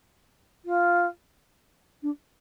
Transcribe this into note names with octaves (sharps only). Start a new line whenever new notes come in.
F4
D4